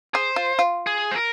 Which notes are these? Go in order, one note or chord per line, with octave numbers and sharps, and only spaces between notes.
G#4 C5
F4
F4
G#4
C5
A#4